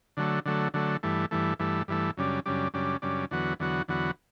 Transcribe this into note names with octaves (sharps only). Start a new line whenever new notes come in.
D3 F#3 A3
D3 F#3 A3
D3 F#3 A3
G2 E3 A3
G2 E3 A3
G2 E3 A3
G2 E3 A3
F#2 C#3 G3 D4
F#2 C#3 G3 D4
F#2 C#3 G3 D4
F#2 C#3 G3 D4
E2 D3 F#3 B3 F#4
E2 D3 F#3 B3 F#4
E2 D3 F#3 B3 F#4